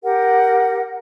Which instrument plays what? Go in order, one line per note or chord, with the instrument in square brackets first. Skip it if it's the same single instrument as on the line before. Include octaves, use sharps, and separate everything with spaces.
[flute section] G4 A#4 F#5